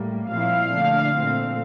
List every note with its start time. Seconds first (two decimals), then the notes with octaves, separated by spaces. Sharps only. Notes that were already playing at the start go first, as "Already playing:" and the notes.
Already playing: A2 G3 A#3
0.29 A#2 F3 C4 E4 F5
0.72 D3 A3 D4
1.14 A#2 F3 A3 C4